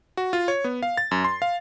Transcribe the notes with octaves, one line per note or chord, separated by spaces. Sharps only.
F#4
F4
C#5
B3
F5
A6
F#2
C6
F5